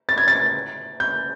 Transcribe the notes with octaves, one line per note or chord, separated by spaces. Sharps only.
A6
G#6
A6
G6